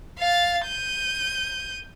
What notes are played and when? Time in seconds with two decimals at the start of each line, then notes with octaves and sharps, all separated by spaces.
0.19 F5 A6
0.65 G6 D#7